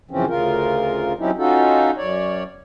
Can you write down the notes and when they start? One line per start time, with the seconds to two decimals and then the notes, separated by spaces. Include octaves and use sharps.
0.11 F#2 C#3 E3 F3 C4 C#4
0.28 D2 C#3 F4 A#4
1.19 F#3 C4 C#4 D#4 E4 G4
1.38 C#4 D#4 F4 F#4 A4
1.97 F#2 C#5 D5